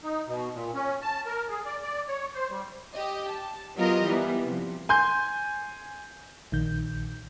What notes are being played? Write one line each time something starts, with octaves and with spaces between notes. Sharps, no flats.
D#4
B2
A#2
C#4
A5
A#4
G#4
D5
D5
C#5
C5
G3
G4 D#5
A5
F#3 B3 F4 G4 A#4 D#5
E3 G3 B3
C3 F3
G#5 C6 G6
A#1 D#3 G6